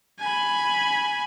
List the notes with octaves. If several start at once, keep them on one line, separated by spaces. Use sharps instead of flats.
G#5 B5